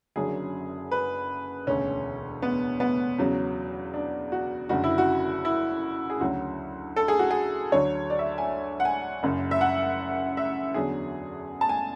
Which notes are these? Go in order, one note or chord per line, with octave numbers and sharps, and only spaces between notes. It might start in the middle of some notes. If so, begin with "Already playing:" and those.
F#1 F#2 D3 F#3 G#4
B4
E1 D2 C#3 C#4
B3
B3
E2 C#3 F#3
D4
F#4
F#1 F#2 D3 F#4
E4
F#4
E4
G#4
D2 C#3 F#3 F#4
A4
G#4
F#4
G#4
D2 D3 F#3 C#5
D5
E5
G#5
F#5
G#5
F#1 F#2 C#3
E5
F#5
E5
E2 D3 F#3 G#4
A5
G#5